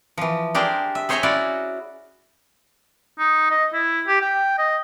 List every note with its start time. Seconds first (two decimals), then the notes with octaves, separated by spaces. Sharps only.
0.18 E3 F3
0.55 D4 G4 G#4 A#4 C5
0.95 E5
1.09 G#4 C5 C#5 E5 G#5 A#5
1.23 C#4 E4 F#4 D5
3.19 D#4
3.51 D#5
3.74 E4
4.07 G4
4.21 G5
4.58 D#5